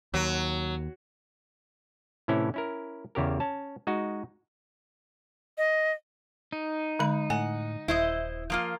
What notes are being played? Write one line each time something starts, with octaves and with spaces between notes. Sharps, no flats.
D#2 F#3
A2 C3 E3 C#4 E4
C#4 E4 A#4
E2 C#3 G4 A#4
C#4 A5
G#3 D#4 F#4
D#5
D#4
D3 G#3 B5
A2 F#5 G#5
D#1 E4 C5 D#5
F3 A#3 F4